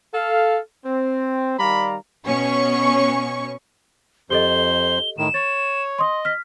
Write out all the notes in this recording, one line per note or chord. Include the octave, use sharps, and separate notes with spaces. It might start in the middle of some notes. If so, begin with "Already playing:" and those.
A4 F5
C4
D#3 G3 D5 F5 A#5 B5
B2 C#4 C#6
F2 G4 A4 C5 D#5 G7
A2 D#3 E7
C#5 A6
D#5 C6 D#6
F6 B6